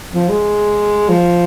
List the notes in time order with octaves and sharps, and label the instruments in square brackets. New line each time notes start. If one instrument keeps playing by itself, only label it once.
[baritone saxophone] F3
G#3
F3